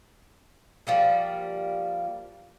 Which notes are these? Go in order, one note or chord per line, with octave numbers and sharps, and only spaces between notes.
F3 G3 A#3